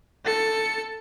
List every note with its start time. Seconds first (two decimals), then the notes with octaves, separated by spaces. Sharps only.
0.25 A4 C#7